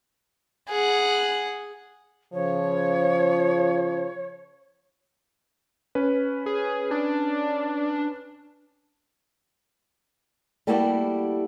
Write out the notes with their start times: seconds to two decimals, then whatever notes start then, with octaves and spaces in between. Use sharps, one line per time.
0.69 G#4 F#5
2.33 C#3 F3 C#5
5.95 C#4 B4
6.46 G#4
6.91 D4
10.67 G3 A3 A#3 E4 F#4 G4